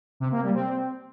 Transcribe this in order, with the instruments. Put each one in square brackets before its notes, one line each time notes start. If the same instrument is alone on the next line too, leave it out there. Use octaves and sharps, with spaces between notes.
[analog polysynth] C3
A#3
G3
C4